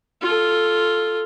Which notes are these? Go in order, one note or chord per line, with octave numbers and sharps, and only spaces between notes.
F4 A4